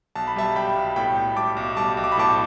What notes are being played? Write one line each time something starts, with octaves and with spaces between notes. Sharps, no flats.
B1 A5
B5
G3 E5 A5
G3 G5 B5
B1
A2 G5 B5
B1
G3 A5 D6
B1
G3 A5 D6
B1
D6
B5
A2 A5 D6